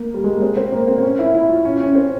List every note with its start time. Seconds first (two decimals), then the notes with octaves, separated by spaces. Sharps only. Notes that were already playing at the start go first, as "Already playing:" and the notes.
Already playing: A#3
0.14 G3
0.24 G#3
0.33 A#3
0.42 C4
0.57 C4
0.72 A#3
0.88 C4
0.98 C4
1.03 C#4
1.19 E4
1.34 E4
1.49 F4
1.65 C#4
1.80 C#4
1.95 C4